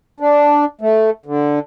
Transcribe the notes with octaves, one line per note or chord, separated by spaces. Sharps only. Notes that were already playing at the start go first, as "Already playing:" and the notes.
D4
A3
D3